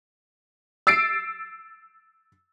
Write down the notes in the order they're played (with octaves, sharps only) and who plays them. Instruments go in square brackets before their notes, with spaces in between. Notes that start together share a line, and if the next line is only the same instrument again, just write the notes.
[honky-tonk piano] E6 A6 C7 D7